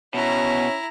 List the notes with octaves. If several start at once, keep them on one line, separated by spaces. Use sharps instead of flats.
B2 C#4 E4 A#5